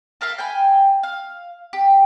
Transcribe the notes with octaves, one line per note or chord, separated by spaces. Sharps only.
A4 A#4 E5 F5
G5 G#5 B5
F5
G4